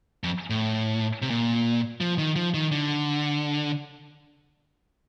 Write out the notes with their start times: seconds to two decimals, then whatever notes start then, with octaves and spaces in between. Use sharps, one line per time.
0.24 F2
0.50 A2
1.22 C3
1.30 A#2
2.01 F3
2.18 D#3
2.36 F3
2.54 D#3
2.72 D3